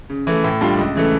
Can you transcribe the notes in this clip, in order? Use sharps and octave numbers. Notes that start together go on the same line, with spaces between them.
C#3
E3 A3
A2
G3 D4 F4
C#2
C#3 E3 A3